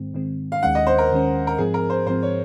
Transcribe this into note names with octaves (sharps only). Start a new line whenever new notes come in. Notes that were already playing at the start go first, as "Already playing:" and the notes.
Already playing: G#2 D#3 G#3 C4
G#2 D#3 G#3 C4
F5
D#2 D#3 G#3 C#4 F#5
D#5
C5
A#4
D#2 D#3 G#3 C#4
A#4
G#2 F3 C4 G#4
A#4
C5
G#2 F3 C4 C5
C#5